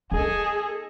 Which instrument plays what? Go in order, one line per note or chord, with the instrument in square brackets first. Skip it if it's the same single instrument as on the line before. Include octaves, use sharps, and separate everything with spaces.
[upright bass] A#3 D#4 [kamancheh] G#4 [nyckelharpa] A4 D#5